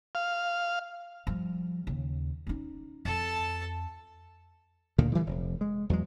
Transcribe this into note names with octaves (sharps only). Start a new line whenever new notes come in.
F5
F3 G3
D#2 C#3
C#4 D#4
F2 A4 A5
D2 A#2 D3 D#3
D3 E3 G3 G#3
F1
G#3
E2 F#3 G#3